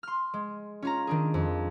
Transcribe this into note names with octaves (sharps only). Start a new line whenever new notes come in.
C6 F6
G#3
C#4 F4 A#5
D#3 D4 G#4
F2